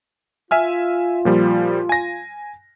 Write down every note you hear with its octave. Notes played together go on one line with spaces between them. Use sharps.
F4 E5 G#5 F6
A#2 F3 G3
G#5 A#6